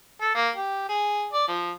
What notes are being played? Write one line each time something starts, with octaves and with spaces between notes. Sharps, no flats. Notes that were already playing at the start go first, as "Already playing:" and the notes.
A4
A#3
G4
G#4
D5
F3